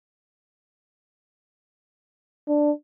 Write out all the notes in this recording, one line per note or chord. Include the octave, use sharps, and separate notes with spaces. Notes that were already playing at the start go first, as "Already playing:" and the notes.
D4